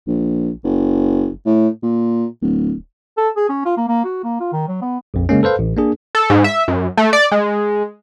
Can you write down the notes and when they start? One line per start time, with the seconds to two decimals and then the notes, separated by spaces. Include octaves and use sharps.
0.07 A#1
0.64 F#1
1.46 A2
1.83 A#2
2.41 D1
3.18 A4
3.37 G#4
3.49 C#4
3.65 F4
3.77 A#3
3.88 A#3
4.05 F#4
4.24 A#3
4.40 F4
4.53 D#3
4.68 F#3
4.82 B3
5.14 A#1 F2
5.29 C#3 G#3 A#3 C#4
5.43 A4 B4 C5 F5
5.59 A1
5.77 A#3 D4 G#4
6.15 A4
6.30 G#2
6.44 E5
6.68 F#2
6.97 A3
7.13 D5
7.32 G#3